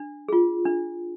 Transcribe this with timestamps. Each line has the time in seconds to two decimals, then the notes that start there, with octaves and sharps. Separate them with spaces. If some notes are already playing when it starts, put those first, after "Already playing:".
Already playing: D4
0.28 F4 G#4
0.66 D4